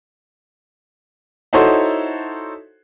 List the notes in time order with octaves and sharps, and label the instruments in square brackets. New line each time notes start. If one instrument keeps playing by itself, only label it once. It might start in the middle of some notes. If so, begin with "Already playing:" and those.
[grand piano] D#4 E4 F#4 A4 C5 C#5